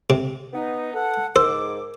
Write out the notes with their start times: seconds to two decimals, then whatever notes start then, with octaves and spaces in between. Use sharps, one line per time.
0.10 C3
0.53 B3 D#4
0.94 A4 F#5
1.36 G#2 A#4 C5 D6